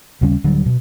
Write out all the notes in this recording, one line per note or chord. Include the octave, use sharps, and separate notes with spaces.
D#2 C#3 G3 C#4
D1 D3 F#3 G3
B2